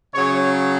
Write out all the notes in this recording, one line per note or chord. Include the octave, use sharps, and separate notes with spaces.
C#3 F#3 C#5